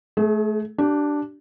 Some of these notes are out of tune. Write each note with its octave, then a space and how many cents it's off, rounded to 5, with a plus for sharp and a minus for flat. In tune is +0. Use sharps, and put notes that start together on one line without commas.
A3 -25 G#4 +25
D4 +0 G4 -25